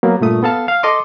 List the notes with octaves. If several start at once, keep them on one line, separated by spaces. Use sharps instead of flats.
F#3 A#3 B3
G2 A#2 A3 D#6
B3 A4 F5 A5
F5
A4 D#5 C6 D6